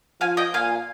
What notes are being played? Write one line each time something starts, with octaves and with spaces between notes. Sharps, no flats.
F3 F5 G#5
D#5 G5
A#2 F5 G#5